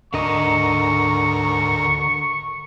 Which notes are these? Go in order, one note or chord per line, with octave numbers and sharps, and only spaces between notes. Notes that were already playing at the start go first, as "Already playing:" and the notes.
D2 G#2 D3 A#4 D#5 A#5 C#6